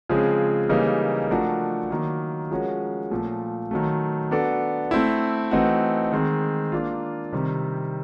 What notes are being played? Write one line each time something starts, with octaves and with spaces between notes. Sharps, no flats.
C#3 F3 G#3 C4
C#3 E3 G3 A#3 D#4
F3 A3 D4 F#4 A#4
D#3 F#3 A#3
F3 G#3 C#4 F#4 A#4
A#2 F3 A3
D#3 F#3 A3
B3 D4 F#4 A4 D5
A3 C4 E4
E3 A3 C4 D#4 F#4
D#3 G#3 C4
A#3 D4 F4
C3 D#3 G3 C4